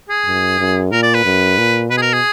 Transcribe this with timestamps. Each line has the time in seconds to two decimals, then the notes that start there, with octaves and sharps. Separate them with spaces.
0.09 G#4
0.26 F#2
0.59 F#2
0.92 A#2 A#4
1.03 D5
1.14 B4
1.25 F#2
1.58 A#2
1.90 B2 B4
1.98 G#4
2.02 A#4
2.13 G#4